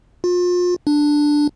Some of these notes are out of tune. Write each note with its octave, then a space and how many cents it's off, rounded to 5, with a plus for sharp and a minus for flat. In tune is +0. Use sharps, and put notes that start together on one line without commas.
F4 +35
D4 +5